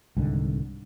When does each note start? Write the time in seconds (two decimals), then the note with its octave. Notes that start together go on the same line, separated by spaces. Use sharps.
0.17 C2 G#2 D3 D#3